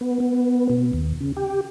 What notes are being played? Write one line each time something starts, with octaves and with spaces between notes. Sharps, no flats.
B3
B3
B2
D#2
C#3
G4